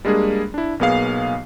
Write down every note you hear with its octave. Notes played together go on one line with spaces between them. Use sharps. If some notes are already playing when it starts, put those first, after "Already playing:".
G3 G#3 A#3 D4 G#4
D4 E4
B1 A#3 B3 G#4 F5 C7